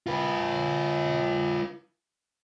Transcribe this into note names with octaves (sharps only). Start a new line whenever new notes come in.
F4 B4